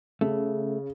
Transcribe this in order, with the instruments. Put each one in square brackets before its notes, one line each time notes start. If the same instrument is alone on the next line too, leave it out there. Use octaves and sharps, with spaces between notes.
[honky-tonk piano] C#3 [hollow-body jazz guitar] A3